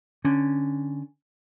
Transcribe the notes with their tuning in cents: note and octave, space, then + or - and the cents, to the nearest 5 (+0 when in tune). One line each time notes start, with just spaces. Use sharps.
D3 +0 C#4 +0